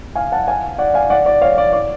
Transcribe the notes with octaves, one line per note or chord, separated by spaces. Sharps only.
F5 G#5
F#5 A5
F5 G#5
D5 F#5
F5 G#5
D5 F#5
D5
C#5 F5
D5
D5